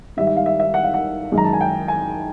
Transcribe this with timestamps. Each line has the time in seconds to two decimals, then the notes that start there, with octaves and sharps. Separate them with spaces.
0.17 G#2 D#3 G3 E5
0.27 E5
0.37 F5
0.46 E5
0.60 E5
0.74 F#5
0.84 F5
0.94 F#5
1.31 F#2 D#3 G#3
1.38 A#5
1.44 A5
1.53 G#5
1.61 G5
1.88 G#5